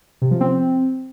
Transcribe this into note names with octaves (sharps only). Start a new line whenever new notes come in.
C3
F3
C4